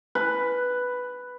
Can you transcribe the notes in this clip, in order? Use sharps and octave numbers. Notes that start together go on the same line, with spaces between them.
B4